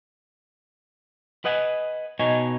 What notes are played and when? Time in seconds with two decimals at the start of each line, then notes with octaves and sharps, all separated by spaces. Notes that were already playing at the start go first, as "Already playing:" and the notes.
1.45 B4 D#5 F#5 G#5
2.19 B2 D#4 C#5 G#5